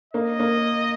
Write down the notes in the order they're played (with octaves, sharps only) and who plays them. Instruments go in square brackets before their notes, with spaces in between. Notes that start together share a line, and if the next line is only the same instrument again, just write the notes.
[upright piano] A#3 [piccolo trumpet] D#5
[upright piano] A#3